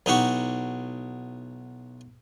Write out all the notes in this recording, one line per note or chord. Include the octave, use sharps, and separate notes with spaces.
B1 D#4 E4 F#4 G4 C#6